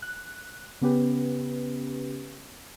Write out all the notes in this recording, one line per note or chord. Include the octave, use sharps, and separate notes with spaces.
F#6
C#3 B3 C#4 G4 B4